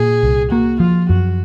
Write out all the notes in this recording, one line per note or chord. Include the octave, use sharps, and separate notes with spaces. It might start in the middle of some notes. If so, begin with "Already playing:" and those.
Already playing: A#2 G#4
C2
A#3 F#4
F3 F4
F#2 F#4